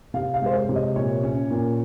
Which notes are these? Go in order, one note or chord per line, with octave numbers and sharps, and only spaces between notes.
C3 F5
F5
G#3 C5
C#5
C3
D#5
A#2 C#5
C#4
A#2